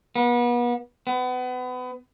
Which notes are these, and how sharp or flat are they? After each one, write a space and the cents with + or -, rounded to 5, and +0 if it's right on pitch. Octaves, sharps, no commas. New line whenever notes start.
B3 -35
B3 +30